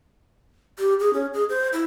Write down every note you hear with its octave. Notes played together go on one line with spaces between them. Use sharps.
G4
G#4
C#4
G#4
C5
E4